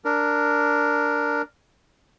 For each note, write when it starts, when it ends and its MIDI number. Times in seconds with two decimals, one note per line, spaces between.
0.05 1.42 62
0.05 1.42 70